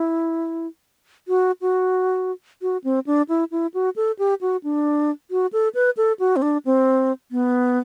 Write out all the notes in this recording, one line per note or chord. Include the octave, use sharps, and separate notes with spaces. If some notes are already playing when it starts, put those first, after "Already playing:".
Already playing: E4
F#4
F#4
F#4
C4
D4
E4
E4
F#4
A4
G4
F#4
D4
F#4
A4
B4
A4
F#4
C4
D4
C4
B3